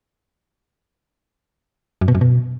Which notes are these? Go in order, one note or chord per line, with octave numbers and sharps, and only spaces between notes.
F#2
B2
F#2
B2